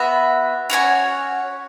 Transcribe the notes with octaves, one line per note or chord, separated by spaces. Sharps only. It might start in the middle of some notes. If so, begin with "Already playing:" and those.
Already playing: B3 F#4 E5
C#4 F#4 C#5 G#5